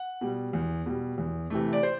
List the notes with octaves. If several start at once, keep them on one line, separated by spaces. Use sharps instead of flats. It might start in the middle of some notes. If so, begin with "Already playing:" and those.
Already playing: F#5
B2 G3
E2
B2 G3
E2
C3 E3 A3
D5
C5